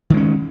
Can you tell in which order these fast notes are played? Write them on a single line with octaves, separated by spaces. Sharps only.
D#3 G#3 C#4